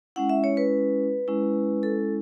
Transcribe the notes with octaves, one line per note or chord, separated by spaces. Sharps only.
G#3 C#4 E4 F#5
E5
C#5
B4
G#3 C#4 E4
A4